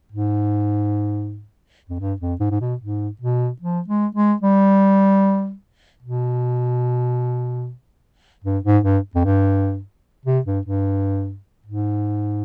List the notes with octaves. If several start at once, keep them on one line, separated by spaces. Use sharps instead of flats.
G#2
F2
G2
F2
G#2
G#2
B2
G#2
B2
F3
G#3
G#3
G3
B2
G2
G#2
G2
F2
G2
C3
G2
G2
G#2